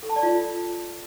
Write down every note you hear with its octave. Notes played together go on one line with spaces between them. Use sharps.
A4
A5
D5
F4